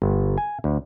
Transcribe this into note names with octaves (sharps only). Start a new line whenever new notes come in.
G1
G#5
D2